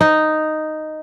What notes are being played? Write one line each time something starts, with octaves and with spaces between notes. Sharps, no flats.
D#4